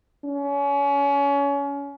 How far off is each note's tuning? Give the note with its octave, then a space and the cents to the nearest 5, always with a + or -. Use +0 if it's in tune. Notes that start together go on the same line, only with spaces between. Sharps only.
C#4 +30